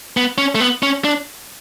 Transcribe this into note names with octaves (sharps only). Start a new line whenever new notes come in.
B3
C#4
A3
B3
C#4
D4